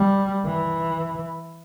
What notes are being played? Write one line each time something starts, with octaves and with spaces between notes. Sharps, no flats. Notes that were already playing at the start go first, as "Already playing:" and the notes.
Already playing: G3
E3